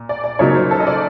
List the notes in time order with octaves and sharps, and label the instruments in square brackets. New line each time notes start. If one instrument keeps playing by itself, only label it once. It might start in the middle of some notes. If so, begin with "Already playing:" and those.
Already playing: [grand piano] A#2
[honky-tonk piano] D5
D5
[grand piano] C#3 F#3 A#3 D#4 [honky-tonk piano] C#5
[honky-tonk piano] C5
A4
D#5
D5